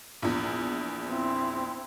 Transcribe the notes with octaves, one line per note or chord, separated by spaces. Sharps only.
A#1 E2
C4 E4